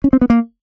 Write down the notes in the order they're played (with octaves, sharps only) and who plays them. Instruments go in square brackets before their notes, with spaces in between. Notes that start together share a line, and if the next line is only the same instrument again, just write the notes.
[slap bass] C#4
C4
B3
A#3